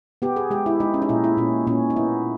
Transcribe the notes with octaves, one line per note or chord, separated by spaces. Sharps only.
B3 G4
G#4
G#3 G4
E4
G#3 D#4
C#4
D#4
A#2 E4
E4
A#2 C#4
A#2 C#4
D#4
B3 E4